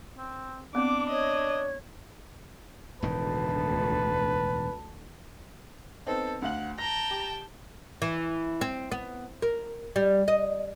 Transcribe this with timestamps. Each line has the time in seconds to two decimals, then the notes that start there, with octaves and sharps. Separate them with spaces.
0.18 C4
0.75 B3 C4 D4 D6
1.10 C#5 D#5
3.02 E1 D2 A2 D#3 B4 A5
6.07 B3 C4 D#4 A4
6.42 D2 F5 F#5 F#7
6.78 G5 A5 A#5 A#6
7.11 G4
8.02 E3
8.61 C4
8.91 B3
9.42 A#4
9.96 G3
10.28 D#5